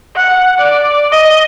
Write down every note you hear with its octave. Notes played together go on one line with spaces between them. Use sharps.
F#5
D5
D#5